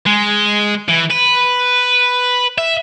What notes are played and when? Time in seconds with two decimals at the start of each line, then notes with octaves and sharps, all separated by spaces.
0.06 G#3
0.88 E3
1.10 B4
2.58 E5